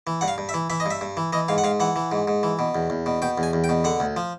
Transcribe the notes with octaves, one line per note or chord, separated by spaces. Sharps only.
E3
G2 F#5
F5
G2
E5
E3
E3 E5
D#5
G2 E5
G2
E3
E3 D#5
G#2 F5
F#5
G#2 F5
E3 F#5
E3
G#2
G#2
E3
B2
E2
E2
B2
B2 G5
E2
G#5
E2
G5
B2
D3 F#5
D2
F3